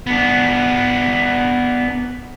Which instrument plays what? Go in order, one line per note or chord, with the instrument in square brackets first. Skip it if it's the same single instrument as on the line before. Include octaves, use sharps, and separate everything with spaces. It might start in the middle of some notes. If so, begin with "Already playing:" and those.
[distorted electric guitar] B3 D4